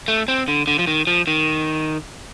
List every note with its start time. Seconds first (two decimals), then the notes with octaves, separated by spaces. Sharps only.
0.08 A3
0.28 C4
0.48 D3
0.67 D3
0.79 F3
0.87 D#3
1.07 F3
1.27 D#3